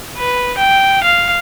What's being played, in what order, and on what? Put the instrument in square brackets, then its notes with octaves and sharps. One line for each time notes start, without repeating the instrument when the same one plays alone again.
[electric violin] B4
G5
F5